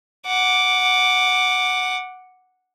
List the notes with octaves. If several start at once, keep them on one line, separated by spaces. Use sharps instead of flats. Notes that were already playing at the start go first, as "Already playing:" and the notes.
F#5 D6